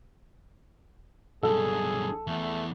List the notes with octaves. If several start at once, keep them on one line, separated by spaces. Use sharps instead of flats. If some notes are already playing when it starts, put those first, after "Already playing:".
B1 G2 G#4 A4
E2 A3